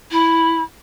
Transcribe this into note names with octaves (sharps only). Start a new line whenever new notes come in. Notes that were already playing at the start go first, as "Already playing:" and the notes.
E4